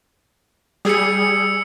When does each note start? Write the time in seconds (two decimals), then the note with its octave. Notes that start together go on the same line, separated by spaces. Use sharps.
0.85 G3 G#4 D#6 E6 C#7